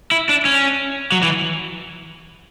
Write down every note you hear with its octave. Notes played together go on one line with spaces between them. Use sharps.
E4
D4
C#4
F#3
E3